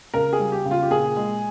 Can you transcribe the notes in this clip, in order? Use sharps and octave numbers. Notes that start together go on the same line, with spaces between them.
C#3 A#4
G#4
G3
G4
C#3
F4
G4
A#2 G#4
G#3